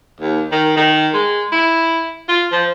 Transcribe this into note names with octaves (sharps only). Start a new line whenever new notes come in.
D#2
D#3
D#3
G#3
E4
F4
F3